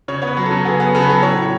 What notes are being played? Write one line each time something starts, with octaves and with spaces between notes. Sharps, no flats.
C#3 C#5
B3 C#5
B4
F#3
A4
C#3
B3 G#4
B3
C#3 A4
B4
F#3 A4
A2 C#5
A2